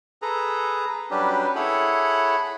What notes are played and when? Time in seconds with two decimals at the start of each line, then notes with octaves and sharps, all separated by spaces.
0.22 G#4 A4 B4 A#5
1.11 F#3 G3 C#4 D4 G4 B4
1.56 E4 G#4 A4 C#5 F#5 B5